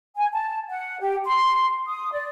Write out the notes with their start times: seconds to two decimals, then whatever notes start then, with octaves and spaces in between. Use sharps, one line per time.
0.17 G#5
0.33 A5
0.69 F#5
1.00 G4
1.25 C6
1.87 D#6
2.12 D5